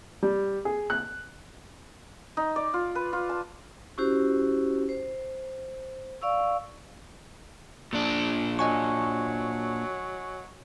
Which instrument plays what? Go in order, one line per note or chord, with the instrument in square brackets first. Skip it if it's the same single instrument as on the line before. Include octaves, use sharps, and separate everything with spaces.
[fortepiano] G3
G#4
F#6
[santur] D#4
D5
F4
B4
F4
A5
[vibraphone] C#4 E4 F#4 G4 C5
C5
D5 F5 C#6 E6
[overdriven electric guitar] A#2 D4
[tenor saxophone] F#3 [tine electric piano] D#5 G#5 C#6